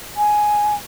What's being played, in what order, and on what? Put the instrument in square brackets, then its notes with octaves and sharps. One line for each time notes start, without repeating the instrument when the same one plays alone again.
[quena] G#5